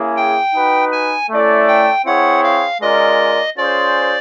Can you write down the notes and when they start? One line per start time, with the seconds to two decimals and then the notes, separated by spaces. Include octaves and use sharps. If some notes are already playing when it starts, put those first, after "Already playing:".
Already playing: A#3 C#4 E4 G#4
0.17 G5
0.55 D#4 F#4 B4
0.92 G#5
1.31 A3 C#4 E4 A4 D5
1.68 G5
2.06 C4 E4 G#4 C#5 F#5
2.43 F5
2.81 G#3 C#4 F4 A#4 D5 D#5
3.57 C#4 F4 G#4 C5 D5